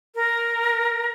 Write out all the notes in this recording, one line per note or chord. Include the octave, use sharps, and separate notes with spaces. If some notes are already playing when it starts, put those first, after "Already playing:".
A#4